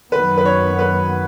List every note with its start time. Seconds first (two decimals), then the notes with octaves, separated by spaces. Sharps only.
0.12 F#2 D#3 F#3 B3 B4
0.37 B4
0.45 C#5
0.79 B4